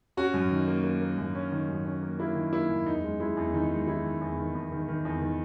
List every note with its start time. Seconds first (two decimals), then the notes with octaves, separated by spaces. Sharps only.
0.17 C#4 F#4
0.34 F#2
0.51 D#3
0.68 A#3
0.84 A#3
1.01 A#3
1.18 F#2
1.35 C#4
1.52 D#3
1.69 F#2
1.86 C#4
2.02 A#3
2.19 A#3 E4
2.35 D#3
2.53 A#3 E4
2.69 F#2
2.86 E2 D#4
3.04 G#3
3.20 G#3 E4
3.37 E2
3.53 D#3 D#4
3.71 G#3
3.87 D#3 E4
4.05 D#3
4.21 E2
4.38 D#3
4.55 E2
4.72 D#3
4.88 D#3
5.05 E2
5.22 D#3